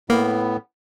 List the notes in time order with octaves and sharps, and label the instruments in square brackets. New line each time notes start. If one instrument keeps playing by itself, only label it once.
[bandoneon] A2 B3 [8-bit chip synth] A#3